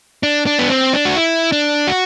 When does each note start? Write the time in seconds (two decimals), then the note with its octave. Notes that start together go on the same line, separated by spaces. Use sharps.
0.23 D4
0.46 D4
0.59 B3
0.70 C4
0.93 D4
1.05 F#4
1.16 E4
1.52 D4
1.87 F#4